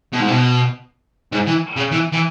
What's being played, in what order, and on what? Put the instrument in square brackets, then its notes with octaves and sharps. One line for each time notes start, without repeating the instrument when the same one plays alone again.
[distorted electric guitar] B2
G#2
B2
G#2
E3
C#3
E3
E3